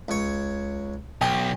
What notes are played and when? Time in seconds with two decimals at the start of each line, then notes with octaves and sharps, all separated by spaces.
0.08 C#2 C#5
1.21 B1 D#5 G5